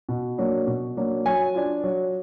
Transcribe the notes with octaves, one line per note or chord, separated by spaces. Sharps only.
B2
F#3 A#3 D4
B2
F#3 A#3 D4
F#3 G#5
D4 F4
F#3